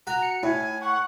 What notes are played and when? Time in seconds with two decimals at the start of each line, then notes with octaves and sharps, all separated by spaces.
0.07 F#4 A#5
0.22 C#7
0.43 A2 E4 G#5
0.81 F#5 C#6